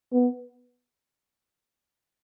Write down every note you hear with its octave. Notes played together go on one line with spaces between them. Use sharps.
B3